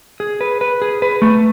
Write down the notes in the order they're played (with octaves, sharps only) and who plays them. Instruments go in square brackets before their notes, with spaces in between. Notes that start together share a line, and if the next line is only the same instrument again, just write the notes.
[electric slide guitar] G#4
B4
B4
G#4
B4
A3